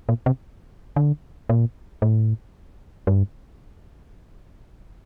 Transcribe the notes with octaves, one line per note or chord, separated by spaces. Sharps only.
A#2
C3
D3
A#2
A2
G2